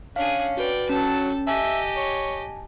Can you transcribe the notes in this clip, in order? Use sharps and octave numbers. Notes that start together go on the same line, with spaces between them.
C#4 D4 G#4 F5
F#4 B4 D5 G5
F#3 C#4 A4 A5
G4 D#5 E5 G#5 A5
C#5